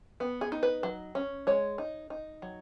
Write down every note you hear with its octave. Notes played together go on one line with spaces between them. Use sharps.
B3
G#4
D#4
B4
F#3
C#4
G#3 C#5
D#4
D#4
F#3